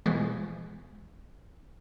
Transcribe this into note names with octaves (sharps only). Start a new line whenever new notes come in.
B2 E3 F3 G#3